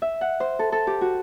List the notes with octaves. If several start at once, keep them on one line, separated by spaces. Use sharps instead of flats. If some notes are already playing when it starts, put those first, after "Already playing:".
E5
F#5
C5
A4
A4
G4
F#4